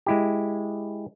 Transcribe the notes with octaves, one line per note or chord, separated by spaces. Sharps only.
G#3 E4 G4